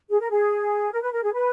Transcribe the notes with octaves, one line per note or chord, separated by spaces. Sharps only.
G#4
A#4
G#4
A#4
B4
A#4
G#4
B4